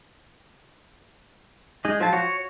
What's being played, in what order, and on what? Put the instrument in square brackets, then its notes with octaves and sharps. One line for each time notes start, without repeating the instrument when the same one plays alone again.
[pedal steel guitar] G#3 D#4
[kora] F3 [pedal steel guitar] F#3 A5
[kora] F#4 [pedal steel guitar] C#5